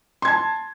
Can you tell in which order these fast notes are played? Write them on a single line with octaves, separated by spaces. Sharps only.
C6 G#6 A5